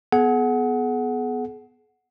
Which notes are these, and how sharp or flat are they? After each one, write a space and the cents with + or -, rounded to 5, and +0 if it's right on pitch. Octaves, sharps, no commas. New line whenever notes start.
B3 +0 G#4 +40 F#5 +0